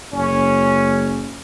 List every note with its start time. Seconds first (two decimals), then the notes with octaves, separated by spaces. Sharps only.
0.13 F#1 C#4